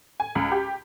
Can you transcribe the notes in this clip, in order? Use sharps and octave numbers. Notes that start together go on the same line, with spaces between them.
G#5
C#2
G4